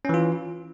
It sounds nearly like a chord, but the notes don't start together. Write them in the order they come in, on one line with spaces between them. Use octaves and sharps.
C#4 E3 F4